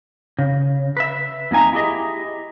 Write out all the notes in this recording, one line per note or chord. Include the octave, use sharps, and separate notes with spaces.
C#3
B4 E5
F2 A#3 D#4 G#5 A#5
E4 G4 G#4 D#5 E5